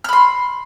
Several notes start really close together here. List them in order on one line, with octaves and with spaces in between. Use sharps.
F6 B5 C6